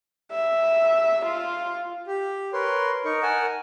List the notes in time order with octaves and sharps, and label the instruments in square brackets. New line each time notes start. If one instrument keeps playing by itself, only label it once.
[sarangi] E5
F4
[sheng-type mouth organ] G4
A#4 B4 C#5 C6
D#4 A#4 C#6
A#4 F#5 G#5 A5